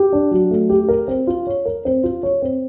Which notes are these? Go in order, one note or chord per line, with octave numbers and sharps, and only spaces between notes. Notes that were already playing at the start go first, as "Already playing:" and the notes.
Already playing: G4
D4
F#3
A3
G4
A#4
C4
F4
C#5
A#4
C4
F4
C#5
C4